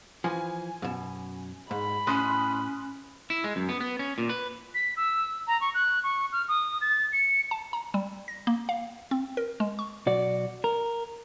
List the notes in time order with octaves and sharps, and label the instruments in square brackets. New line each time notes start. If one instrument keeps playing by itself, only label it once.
[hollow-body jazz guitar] E3 F3 [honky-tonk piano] G#5
[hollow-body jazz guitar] F#2 B2
[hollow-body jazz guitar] G#2 [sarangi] B5
[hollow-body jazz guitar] A2 [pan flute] C#4 [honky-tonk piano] C6 D#6 F#6
[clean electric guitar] E4
G#3
F#2
B3
B3
C#4
A#2
B4
[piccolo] B6
E6
A#5
C#6
F#6
C#6
F6
D#6
A6
C#7
[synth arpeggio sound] A5
A#5
G3
A#6
A#3
F5
C4
A#4
G#3
C#6
[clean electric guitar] B1 F#4 D5
A#4